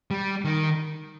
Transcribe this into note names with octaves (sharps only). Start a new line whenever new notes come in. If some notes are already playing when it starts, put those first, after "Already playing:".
G3
D#3